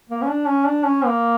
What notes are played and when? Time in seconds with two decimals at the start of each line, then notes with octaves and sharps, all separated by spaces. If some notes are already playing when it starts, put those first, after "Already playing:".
0.09 A#3
0.22 C#4
0.28 D4
0.47 C#4
0.66 D4
0.85 C#4
1.06 A#3